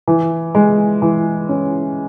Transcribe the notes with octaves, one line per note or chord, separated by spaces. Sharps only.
E3
G#3
E3
C#4